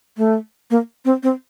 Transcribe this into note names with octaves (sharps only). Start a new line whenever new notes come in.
A3
A#3
C4
C4